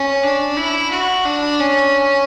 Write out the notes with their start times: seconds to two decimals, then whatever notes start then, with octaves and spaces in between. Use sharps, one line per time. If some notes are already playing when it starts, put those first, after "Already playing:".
Already playing: C#4
0.23 D4
0.57 E4
0.91 F#4
1.25 D4
1.59 C#4